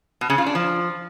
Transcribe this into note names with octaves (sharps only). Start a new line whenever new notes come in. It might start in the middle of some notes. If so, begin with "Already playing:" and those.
B2
C#3
F4
D4
F3